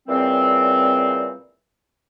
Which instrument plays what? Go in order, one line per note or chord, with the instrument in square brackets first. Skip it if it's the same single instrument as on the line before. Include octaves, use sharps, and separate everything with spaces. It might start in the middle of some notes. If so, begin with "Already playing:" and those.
[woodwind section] A#2 C#3 E3 G3 C4